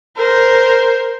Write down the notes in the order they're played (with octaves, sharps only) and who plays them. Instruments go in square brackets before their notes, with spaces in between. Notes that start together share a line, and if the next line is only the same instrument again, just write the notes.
[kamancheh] A#4 C5